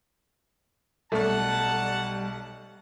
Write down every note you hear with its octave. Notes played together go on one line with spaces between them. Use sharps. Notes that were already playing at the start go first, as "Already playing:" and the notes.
B1 G3 A3 F#5 A5